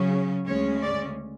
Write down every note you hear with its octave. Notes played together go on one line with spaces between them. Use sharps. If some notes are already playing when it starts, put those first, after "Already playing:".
Already playing: C#3 F#3 C#4
D2 C#3 G#3 C#4 C#5
D5